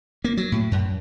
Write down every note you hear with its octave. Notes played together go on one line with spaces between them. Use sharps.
A#3
F#3
A2
F#2